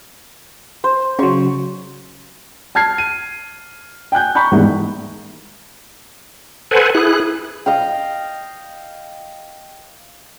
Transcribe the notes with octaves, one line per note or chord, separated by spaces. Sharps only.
C5
C#3 F#3 C#6
A5 F6 G#6 C7
D#7
G5 G#5 F#6 G6
A#5 B5 C#6 G6
D#2 G#2 E3 G3 G#3 B3
A4 B4 C5 F#5 G#5
E4 G#4 F#6
D#5 F5 G5